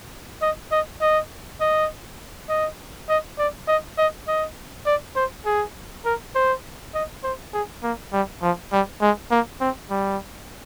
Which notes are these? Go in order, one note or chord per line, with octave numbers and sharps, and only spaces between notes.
D#5
D#5
D#5
D#5
D#5
D#5
D5
D#5
D#5
D#5
D5
C5
G#4
A#4
C5
D#5
C5
G#4
A#3
G3
F3
G3
G#3
A#3
C4
G3